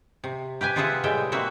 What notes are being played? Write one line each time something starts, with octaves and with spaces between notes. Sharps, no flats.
C3
G4 B4 G5 G#5
C3 F4 G#4 B4 E5 F#5
A2 G3 G#3 E5 G5
A#3 C4 F#4 E5